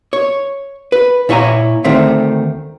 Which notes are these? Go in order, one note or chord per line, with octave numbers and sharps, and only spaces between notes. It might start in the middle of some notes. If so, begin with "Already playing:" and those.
C#5
B4
A#2 E4 C#5 E5 G#5 A#5
D2 D#3 A3 C4 E5